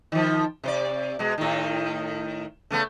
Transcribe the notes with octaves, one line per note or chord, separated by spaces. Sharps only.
D#3 F3
C3 C5 D5
B2 G#3
A2 D#3
C#3 A3 B3